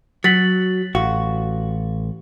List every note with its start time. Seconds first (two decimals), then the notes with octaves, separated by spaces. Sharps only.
0.24 F#3 A6 B6 F#7
0.95 A1 F#4 F5